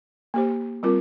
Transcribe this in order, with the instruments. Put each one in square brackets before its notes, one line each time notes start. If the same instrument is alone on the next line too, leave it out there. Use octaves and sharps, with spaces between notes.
[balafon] A#3 G4 C5
G3 C4 F4 A#4